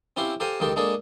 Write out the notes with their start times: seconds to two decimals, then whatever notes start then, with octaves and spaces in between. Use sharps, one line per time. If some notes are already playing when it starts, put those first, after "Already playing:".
0.17 C4 C#4 E4 F4 G4 C5
0.40 G4 A4 C5 F5 G#5 A#5
0.60 C#2 D#3 F4 G4 A4
0.76 G#3 A#3 D4 G#4 A4